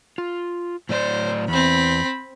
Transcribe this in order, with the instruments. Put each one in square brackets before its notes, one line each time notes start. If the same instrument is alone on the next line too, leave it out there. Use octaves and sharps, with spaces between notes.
[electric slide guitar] F4
[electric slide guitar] A2 F#3 D5 [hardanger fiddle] C5
[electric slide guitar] E2 [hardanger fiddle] C4 B5